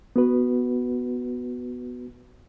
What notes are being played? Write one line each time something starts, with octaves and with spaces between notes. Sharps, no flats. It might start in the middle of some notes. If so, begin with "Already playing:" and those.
B3 F#4 B4